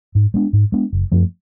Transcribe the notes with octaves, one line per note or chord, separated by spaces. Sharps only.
G#2
G#3 B3 D4
G#2
G#3 B3 D4
F#1
F#2 F3 A3